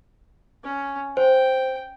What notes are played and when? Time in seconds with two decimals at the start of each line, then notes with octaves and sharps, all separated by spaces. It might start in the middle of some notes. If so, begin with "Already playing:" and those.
0.63 C#4
1.17 C5 G5